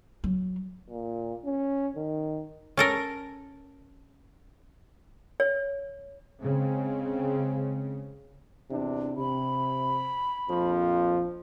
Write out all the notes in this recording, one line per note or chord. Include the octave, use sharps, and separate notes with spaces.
F#3
A#2
C#4
D#3
C#4 A4 A#4
C#5
C#3 G#3 C4
E2 C3 D4
C3 B5
A#1 F2 F3